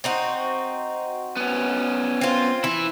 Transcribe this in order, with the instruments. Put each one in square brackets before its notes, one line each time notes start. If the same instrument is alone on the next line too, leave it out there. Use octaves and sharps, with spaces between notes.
[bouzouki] C4 D#4 F#4
[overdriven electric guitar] B3 C#4
[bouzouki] C4 F4
[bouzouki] E3 [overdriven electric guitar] E4